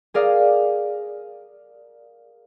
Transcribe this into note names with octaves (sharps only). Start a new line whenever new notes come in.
G#4 A#4 D5 F5 D#6